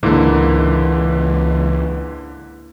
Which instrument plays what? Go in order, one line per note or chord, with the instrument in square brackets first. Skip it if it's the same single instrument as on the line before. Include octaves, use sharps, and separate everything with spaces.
[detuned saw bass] C#2 [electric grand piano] G#2 D3 [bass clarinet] E3 [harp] A#3 E4